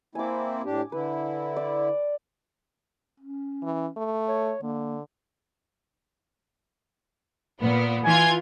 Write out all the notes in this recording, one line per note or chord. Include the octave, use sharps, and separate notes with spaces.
A#3 C4 E4 G#5 D6
A2 D4 G4
D3 E4 B4
D5
C#4
E3
A3
C#5
D3 A#3
A#2 B3
E3 F4 G#5 G#6